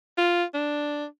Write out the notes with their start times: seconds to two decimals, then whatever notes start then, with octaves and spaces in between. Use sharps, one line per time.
0.18 F4
0.54 D4